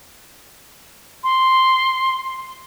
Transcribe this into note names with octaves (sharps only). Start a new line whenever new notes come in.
C6